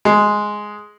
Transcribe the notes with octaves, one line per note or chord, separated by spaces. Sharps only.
G#3